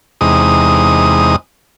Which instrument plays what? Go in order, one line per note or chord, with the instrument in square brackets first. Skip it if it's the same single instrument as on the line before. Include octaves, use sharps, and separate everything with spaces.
[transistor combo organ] E2 C3 G#3 D#4 D#6